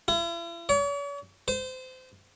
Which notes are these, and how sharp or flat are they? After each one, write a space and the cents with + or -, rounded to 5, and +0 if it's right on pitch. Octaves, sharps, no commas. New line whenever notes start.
E4 +45
C#5 +45
C5 -25